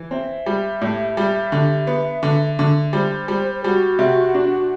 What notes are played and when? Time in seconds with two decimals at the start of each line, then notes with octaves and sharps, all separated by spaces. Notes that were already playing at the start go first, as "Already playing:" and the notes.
Already playing: E3
0.11 C4 E5
0.46 G3
0.81 A2
1.17 G3
1.52 D3
1.87 B3
2.23 D3
2.59 D3
2.93 G3 C5
3.28 G3
3.63 G3 F#4
3.99 C3
4.34 D4